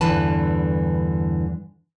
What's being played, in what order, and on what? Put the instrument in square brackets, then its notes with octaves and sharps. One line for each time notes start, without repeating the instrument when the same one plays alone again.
[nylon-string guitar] E2 G2 D3 E3 B4 A5